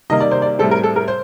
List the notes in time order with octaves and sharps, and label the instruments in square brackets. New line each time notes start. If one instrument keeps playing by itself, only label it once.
[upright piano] C3 D#3 G3 A#3 D#5
D5
C5
D5
A2 G3 C4 A4
A#4
A4
A#4
C5